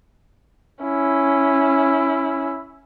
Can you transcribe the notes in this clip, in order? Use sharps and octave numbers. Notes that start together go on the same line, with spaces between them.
C#4 E4